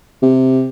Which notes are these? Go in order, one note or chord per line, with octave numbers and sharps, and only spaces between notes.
C3